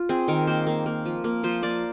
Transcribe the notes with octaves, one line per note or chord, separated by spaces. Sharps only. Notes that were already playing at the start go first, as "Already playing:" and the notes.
Already playing: F4
C4 G#4
D#3 A#4
A#3 C5
A#3
A#3
F3
A#3
F3 C5
A#3 D5